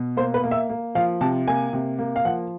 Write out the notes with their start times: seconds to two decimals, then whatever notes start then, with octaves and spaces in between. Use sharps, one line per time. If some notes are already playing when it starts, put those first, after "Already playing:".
Already playing: B2
0.17 A#3 C5
0.34 B4
0.43 A#3
0.51 E5
0.69 A#3
0.95 F3 F5
1.21 C3 A5
1.48 A#3 G#5
1.73 C3
1.99 A#3
2.16 F5
2.25 F3 F#5